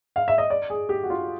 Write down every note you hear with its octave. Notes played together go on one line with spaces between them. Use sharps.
F5
E5
D#5
D5
G#4
G4
F#4
F4